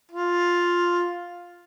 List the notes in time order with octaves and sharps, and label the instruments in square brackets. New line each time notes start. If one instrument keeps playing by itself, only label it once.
[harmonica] F4